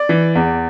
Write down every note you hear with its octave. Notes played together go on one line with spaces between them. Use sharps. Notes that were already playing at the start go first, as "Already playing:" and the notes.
Already playing: D5
E3
E2